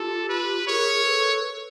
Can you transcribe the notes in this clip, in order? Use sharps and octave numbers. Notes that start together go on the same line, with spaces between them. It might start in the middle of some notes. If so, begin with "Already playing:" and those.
Already playing: F4 G4 A4
B4
G#4 A#4 C#5
A4 B4